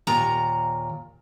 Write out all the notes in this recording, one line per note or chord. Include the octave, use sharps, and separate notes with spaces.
D#2 A#2 A#5